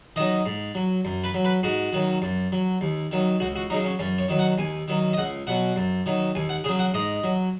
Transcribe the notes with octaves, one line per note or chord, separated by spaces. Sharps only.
D#3 F#3 D#5
G#2
F#3
F#2
B4
F#3
B4
G#2 F#4
D#3 F#3
F#2
F#3
D#2
D#3 F#3
C#2 F#4
F#4
C#3 F#3 D#4
C#4
F#2 C#4
C#5
D#3 F#3
F#5
D#2 G#5
D#3 F#3
D#5
C#2 F#5
B2 F#3 F#5
F#2
D#3 F#3
D#2 G#5
F#5
C#3 F#3 G#4
F#5
G#2 D#5
F#3